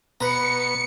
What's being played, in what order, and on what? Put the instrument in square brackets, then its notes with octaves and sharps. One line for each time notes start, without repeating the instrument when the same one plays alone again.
[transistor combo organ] B2 B3 [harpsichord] B4 A#5 [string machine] C#7